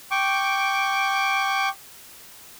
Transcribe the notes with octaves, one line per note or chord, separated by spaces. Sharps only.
G5 C#6 D6